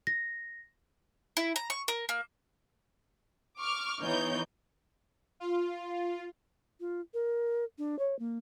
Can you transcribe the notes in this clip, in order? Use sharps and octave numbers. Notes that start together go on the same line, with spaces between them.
A#6
E4
A#5
C#6
A#4
A#3
C#6 D6 F6
E3 B3 D#4 C#5 G6
F4
F4
A#4
D4
C#5
A#3